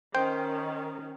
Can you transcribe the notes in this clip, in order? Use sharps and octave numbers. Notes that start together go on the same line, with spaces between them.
D#3 C#4 C5 G5